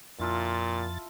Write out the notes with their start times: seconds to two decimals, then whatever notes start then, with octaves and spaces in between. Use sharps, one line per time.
0.20 F2 A#2 E4 F4 A4 A6